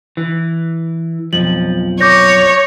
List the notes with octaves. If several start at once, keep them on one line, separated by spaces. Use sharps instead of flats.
E3
B1 F2 F3 F#7
C#5 D6 G6 A#6